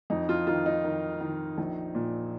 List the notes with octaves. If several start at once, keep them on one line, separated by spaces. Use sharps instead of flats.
F2 D#4
F4
D#3 F4
D#4
D#3
D#3
A#1
A#2